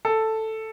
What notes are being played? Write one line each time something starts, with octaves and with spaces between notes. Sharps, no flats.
A4